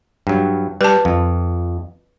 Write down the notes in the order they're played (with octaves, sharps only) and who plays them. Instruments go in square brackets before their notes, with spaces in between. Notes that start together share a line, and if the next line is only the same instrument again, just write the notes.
[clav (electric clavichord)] G2 F#3
[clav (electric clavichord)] G3 [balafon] B4 A5
[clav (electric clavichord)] F2